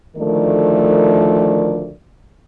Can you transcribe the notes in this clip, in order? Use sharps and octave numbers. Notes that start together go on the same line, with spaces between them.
D2 D#3 F3 A3 A#4 D5